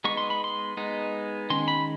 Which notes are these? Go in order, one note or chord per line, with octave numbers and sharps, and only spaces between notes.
G#3 B3 D#4 C#6
C6
B5
C6
G#3 B3 D#4
D#3 G#3 C#4 C6
B5